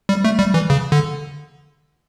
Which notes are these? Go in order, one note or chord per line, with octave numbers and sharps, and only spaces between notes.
G3
A3
G3
E3
C#3
D3